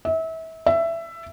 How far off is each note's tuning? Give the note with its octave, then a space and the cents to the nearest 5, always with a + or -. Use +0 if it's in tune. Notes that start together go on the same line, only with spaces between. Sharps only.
E5 -30
E5 +15